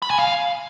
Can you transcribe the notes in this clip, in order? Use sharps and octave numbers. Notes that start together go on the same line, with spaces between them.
B5
G#5
F5